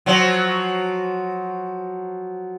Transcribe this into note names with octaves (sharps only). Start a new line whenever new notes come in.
F3 F#3